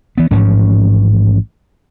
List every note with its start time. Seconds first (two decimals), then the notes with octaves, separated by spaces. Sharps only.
0.18 E3 B3
0.31 A1 G#2 F3 C#4